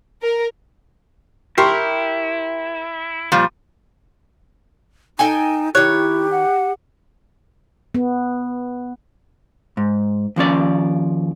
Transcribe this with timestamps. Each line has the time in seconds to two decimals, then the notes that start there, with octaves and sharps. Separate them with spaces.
0.22 A#4
1.58 E4 G4 A#4 C6 C#6
3.32 A#2 F3 G3
5.19 D#4 A4 G5 G#5
5.75 D#3 E4 G4 C#5 F#6
6.31 F#5
7.95 B3
9.77 G#2
10.36 D#2 F3 C#4 D5